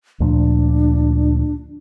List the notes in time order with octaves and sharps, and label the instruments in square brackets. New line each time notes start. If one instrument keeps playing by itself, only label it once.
[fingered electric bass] D2 A#2 F3 [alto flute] D4